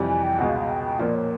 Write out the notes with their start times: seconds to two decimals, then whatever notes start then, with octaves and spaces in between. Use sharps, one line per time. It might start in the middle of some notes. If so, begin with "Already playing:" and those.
Already playing: F2 C3 E3 G3
0.09 G#5
0.23 G5
0.38 C#2 B2 G#3 F#5
0.49 F5
0.59 F5
0.69 G5
0.84 G5
0.99 A#2 F3 A#3 D5
1.15 C#5